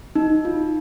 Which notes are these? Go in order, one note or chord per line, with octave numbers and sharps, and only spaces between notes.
D#4
F4